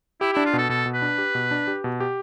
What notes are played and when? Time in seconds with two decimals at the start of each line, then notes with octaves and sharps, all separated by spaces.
0.21 E4 G4
0.33 D4 E4
0.46 F4
0.53 B2 A4
0.69 B2 A4
0.86 B2
0.94 B4
1.02 D4
1.18 G4
1.35 B2
1.51 D4
1.67 G4
1.84 B2
2.00 G4